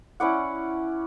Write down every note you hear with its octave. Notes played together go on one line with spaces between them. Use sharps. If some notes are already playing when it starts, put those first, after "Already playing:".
C#4 E4 D5 F#5